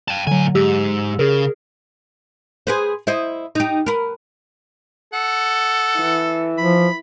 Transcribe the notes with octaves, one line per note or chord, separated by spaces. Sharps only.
G5 A5
A2 D3 F#3 G#5
G#2 G4 E6
C#3 G#4 A#4
G#4 B4 C5
E4 C5 D#5
D#4 G4
A#4 B4
A4 F#5
E3
F3 B5